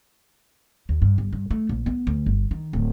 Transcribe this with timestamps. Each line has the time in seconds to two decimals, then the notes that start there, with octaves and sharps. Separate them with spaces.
0.89 D#2
1.02 G2
1.18 G1
1.33 G2
1.51 A3
1.69 A#1
1.86 B3
2.07 D2
2.26 G1
2.51 D#3
2.73 D1